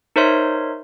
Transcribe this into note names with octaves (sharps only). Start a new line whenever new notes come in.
D#4 A#4 C5 C#5 E5 C6